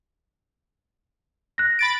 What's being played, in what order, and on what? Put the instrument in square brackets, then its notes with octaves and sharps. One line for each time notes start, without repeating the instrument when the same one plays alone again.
[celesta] F#6 A#6
[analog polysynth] B5 A6 D7